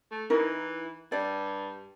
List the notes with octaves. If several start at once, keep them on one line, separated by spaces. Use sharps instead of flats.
A3
E3 D#4 E4 A#4
G2 D5